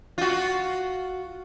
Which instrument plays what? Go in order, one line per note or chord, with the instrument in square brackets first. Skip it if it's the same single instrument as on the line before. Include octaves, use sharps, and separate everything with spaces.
[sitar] F4 F#4